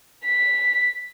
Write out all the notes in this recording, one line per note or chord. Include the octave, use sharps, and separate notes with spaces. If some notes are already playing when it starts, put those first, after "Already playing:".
B6